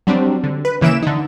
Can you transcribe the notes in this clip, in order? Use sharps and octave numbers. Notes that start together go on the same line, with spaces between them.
F#3 G3 C4 D4
D3
B4
C#3 E3 A#3 E5 D7 E7
D3 D#4